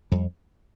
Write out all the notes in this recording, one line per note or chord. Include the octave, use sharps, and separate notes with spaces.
F2 G3